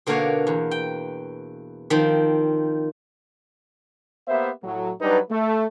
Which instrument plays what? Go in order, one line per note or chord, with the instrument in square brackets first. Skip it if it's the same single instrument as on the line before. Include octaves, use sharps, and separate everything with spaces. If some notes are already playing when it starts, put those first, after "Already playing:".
[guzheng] B2 D3 A#3 A#4 C#5 F5
E2
G5
D#3 F3 C4
[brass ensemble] A#3 B3 G4 C5 E5
A2 F#3
F#3 G3 D4 D#4 B4
A3